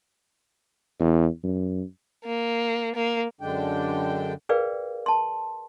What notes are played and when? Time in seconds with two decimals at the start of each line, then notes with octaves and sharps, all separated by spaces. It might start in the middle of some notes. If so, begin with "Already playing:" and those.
1.00 E2
1.44 F#2
2.25 A#3
2.95 A#3
3.41 F#2 D3 G#3 D4 G5
4.49 G#4 A#4 B4 D5 F5 G5
5.06 A5 C6